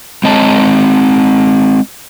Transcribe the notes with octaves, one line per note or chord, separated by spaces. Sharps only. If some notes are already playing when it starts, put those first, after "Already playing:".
G#3 C4 C#5 D#5 A5